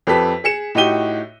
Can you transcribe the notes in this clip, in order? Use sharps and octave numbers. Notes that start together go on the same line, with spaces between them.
F2 G4 A4 B4 A5 B6
G#4 C#7 E7
A2 D#4 F#4 G4 D#7 G7